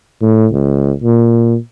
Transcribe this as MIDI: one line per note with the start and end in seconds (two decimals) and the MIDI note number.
0.22 0.46 45
0.52 0.92 37
1.03 1.56 46